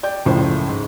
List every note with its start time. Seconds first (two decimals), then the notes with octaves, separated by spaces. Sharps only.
0.03 D5 G5 G6
0.25 F#1 C#2 A2 F3 C5
0.68 G#2